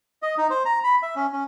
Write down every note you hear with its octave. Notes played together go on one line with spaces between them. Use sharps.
D#5
D#4
C5
A#5
B5
E5
C#4
C#4